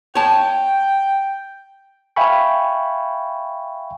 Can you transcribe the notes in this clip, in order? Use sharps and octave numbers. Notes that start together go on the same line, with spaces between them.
C#5 G5 A5
E5 F5 G5 G#5 B5 C#6